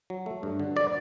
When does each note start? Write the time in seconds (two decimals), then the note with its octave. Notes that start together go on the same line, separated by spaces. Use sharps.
0.10 F#3
0.26 A3
0.43 G2
0.59 D3
0.76 F#3 D5